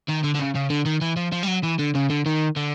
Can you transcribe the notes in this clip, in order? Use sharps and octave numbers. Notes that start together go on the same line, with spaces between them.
D#3
D3
D3
C#3
C#3
D3
D#3
E3
F3
F3
G3
F#3
E3
D3
C#3
D3
D#3
D3